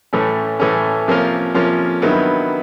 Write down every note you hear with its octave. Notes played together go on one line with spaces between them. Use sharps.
A2 E3 A3 C#4
A2 E3 A3 C#4
C3 F3 A#3 C#4 F4
C3 F3 A#3 C#4 F4
G2 D#3 F#3 B3 E4